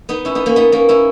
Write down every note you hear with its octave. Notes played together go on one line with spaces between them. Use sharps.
B3 D#4
C#4 E4
B3 D#4
A#3 C#4
B3 D#4
A#3 C#4
C#4 E4